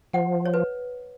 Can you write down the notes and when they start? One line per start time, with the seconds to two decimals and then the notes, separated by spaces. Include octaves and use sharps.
0.14 F3 F#5
0.45 C#5
0.54 B4